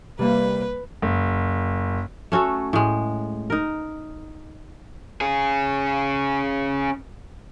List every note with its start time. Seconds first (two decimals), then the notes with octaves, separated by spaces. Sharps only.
0.19 C3 G3 A#3 B4
1.02 F#1
2.32 A3 C#4 F#4 A4
2.73 A2 G#3
3.50 D#4 A#4
5.21 C#4 G#4